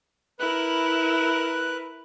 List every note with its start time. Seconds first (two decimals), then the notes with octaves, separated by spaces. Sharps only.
0.39 E4 A#4 B4 F#6